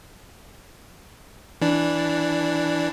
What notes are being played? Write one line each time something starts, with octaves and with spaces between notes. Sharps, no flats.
E3 D4